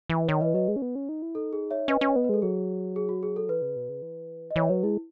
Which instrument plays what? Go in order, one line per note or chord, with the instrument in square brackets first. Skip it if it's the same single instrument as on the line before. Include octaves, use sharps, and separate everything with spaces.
[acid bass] E3
[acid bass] D#3 [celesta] C#5
[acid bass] E3 [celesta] B4 D#5
[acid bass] F#3 [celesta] B4 D#5
[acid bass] G#3
C#4
B3
C#4
D#4
E4
[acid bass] D#4 [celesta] A4
[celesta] G#4
C#5 E5
[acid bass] C#4 [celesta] B4 D#5
[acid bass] C#4
B3
[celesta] B4
[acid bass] G#3 [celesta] A4
[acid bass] F#3 [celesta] G#4
[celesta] G#4
F#4
G#4
A4
[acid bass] E3 [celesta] B4
[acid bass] C#3
B2
C#3
E3
[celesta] D#5
[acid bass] E3 [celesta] C#5
[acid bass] F#3 [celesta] B4
[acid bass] G#3 [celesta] E4